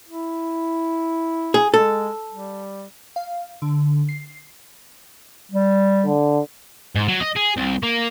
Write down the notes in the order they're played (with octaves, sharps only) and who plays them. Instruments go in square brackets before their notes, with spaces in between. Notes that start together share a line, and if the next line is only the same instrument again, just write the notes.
[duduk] E4
[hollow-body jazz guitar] G#4
[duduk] G#3 [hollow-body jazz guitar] A4
[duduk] G3
[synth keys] F5
D3
C7
[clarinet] G3
[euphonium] D3
[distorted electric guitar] G#2
F#3
D#5
G#4
C2
A#3